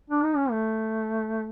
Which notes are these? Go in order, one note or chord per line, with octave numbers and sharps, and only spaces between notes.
D4
D#4
C#4
A3